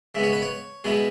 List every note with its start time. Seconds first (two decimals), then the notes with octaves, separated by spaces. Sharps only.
0.15 C#3 G#3 B3 E5
0.24 C#5
0.33 B4
0.42 C#5
0.84 B2 G#3 B3 E4 G#4